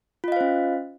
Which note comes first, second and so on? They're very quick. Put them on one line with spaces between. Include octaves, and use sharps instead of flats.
F4 D#5 F5 C5 C#4